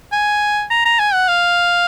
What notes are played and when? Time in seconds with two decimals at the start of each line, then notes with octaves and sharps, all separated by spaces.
0.12 G#5
0.70 A#5
0.85 A#5
0.99 G#5
1.13 F#5
1.28 F5